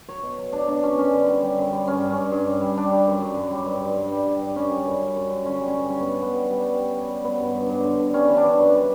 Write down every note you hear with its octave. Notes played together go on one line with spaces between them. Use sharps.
F#3 C#5
B2
F#3
F#3 D4
B2 D4
B2 C#4
F#2 C#4
D3
G3
G3
F#2
G3
G2 C#4
G2
C#4
G2
G2
G2
G3
G3 D4
G3
F#2
F#2
F#2
G3
G2
G2
G2
G3
G3
G2
G3 C#4
F#2
F#2
G3
F#2
F#2
D3 C#4
G3
C#4
G2
G2 C#4
G2 B3
G3 B3
G3
G3
G3
G3
G3
G3
F#3 B3
G2
G2
G2
D3
D3
G3 C#4
E3
D4
E3
F#2
G3